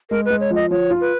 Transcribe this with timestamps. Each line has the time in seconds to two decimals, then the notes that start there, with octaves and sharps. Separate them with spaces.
0.10 G#3 A#4
0.25 B4
0.30 G#3
0.40 C#5
0.51 F3
0.56 D#5
0.71 F3 C#5
0.90 F4
1.01 B4